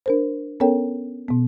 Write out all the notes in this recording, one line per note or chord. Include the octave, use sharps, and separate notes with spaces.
D4 A#4 C5
B3 C#4 A4 A#4 C#5 G5
B2 B3